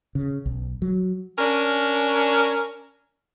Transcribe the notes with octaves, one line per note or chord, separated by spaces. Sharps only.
C#3
B1
F#3
C#4 D4 A#4